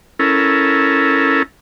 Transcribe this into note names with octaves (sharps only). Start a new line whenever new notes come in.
C#4 E4 A4 A#4